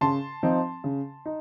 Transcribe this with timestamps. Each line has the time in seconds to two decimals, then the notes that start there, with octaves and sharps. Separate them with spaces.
0.01 C#3 A5 C6
0.43 F3 C4 D#4
0.84 C#3
1.26 D#4